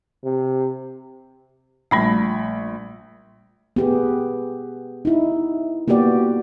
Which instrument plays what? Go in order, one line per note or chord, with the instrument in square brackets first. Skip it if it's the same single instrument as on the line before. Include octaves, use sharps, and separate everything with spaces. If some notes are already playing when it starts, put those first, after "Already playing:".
[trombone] C3
[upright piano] A#1 B5 [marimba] G3 A3
[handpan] B3 G4 G#4
D#4 E4
A#3 B3 F#4 G4 D5